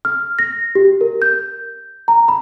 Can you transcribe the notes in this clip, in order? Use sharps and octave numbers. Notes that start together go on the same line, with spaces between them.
F6
A#6
G4
A#4
G6
A#5
B5